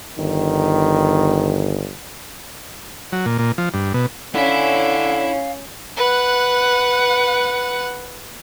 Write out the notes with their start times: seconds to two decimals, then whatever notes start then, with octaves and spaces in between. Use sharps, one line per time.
0.18 G1 D#3
3.13 F#3
3.26 A#2
3.39 A#2
3.58 F3
3.74 G2
3.94 B2
4.35 D3 C#4 E4 F5 B5
5.97 B4 F#5